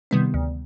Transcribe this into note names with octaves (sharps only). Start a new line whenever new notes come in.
C3 D#3 G3 B3
D2